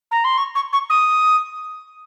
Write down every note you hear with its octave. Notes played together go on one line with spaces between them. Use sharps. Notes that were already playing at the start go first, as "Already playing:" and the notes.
A#5
C6
C#6
C#6
C#6
D#6